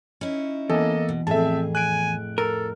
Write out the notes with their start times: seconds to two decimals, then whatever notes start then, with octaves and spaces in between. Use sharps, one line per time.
0.21 C#4 D#4 E4
0.70 E2 A#3 A4 D#5
1.09 B2
1.27 F2 A2 C4 G#4 E5 A5
1.75 G#5 F#6 D7
2.38 A4 A#4